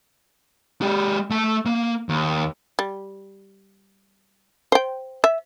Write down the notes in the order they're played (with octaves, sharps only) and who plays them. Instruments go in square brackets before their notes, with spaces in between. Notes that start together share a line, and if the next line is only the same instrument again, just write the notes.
[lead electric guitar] G#3 G4
A3 A5
A#3
D#2
[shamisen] G3
C5 G5
E5